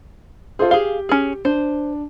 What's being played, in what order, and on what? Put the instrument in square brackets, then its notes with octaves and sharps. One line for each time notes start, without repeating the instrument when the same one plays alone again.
[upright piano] F4 A4 C5 [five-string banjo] G#4
[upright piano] G4 G7 [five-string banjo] G#4 F5
[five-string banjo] C#4 G#4
[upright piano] D4 [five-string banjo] C5